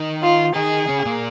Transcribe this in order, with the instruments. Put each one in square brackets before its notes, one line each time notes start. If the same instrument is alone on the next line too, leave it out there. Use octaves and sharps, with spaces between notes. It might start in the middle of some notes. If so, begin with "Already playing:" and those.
Already playing: [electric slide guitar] D#3 D#4
[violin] F4
[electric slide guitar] D#3 D#4 [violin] G#4
[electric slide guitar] C#3 C#4
A#2 A#3